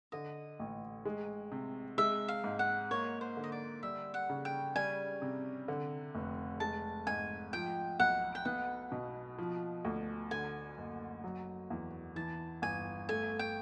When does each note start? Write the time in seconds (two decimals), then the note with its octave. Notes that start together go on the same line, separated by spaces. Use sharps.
0.12 D3 D#5
0.60 A1
1.05 G#3
1.52 C3
1.98 G#3 E5
2.28 F5
2.44 G#2
2.59 F#5
2.91 A#3 C#5
3.21 C5
3.37 D3
3.44 D#5
3.52 D5
3.83 G3 E5
4.14 F#5
4.30 C#3
4.45 G5
4.75 G3 G#5
5.22 C3
5.68 D3
6.15 F1
6.60 G#3 A5
7.07 G#2 G#5
7.53 F3 G5
8.00 B1 F#5
8.35 G5
8.45 B3 F#5
8.92 B2
9.38 F3
9.85 D2
10.31 D3 G#5
10.78 F#1
11.24 F#3
11.70 E2
12.16 E3 A5
12.62 G1 G#5
13.09 A3 G#5
13.39 G5